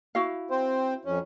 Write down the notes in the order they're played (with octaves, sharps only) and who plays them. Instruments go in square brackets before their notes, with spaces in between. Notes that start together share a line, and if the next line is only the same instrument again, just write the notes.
[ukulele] E4 F#4 F5
[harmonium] C4 C5
F2 C#4